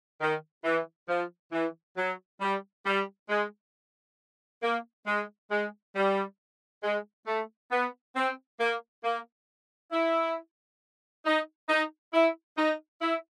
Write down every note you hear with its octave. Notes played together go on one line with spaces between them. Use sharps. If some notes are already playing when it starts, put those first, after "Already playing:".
D#3
E3
F3
E3
F#3
G3
G3
G#3
A#3
G#3
G#3
G3
G#3
A3
B3
C4
A#3
A#3
E4
D#4
D#4
E4
D#4
E4